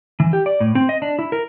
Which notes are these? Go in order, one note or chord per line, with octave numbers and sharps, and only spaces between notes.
E3
G4
D5
A2
C4
D#5
D4
E4
A#4